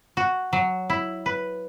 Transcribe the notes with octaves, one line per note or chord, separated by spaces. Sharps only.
F#4
F#3
E4
B4